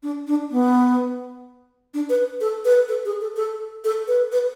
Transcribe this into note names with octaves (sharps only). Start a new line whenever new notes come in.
D4
D4
B3
D4
B4
A4
B4
A4
G#4
A4
A4
A4
B4
B4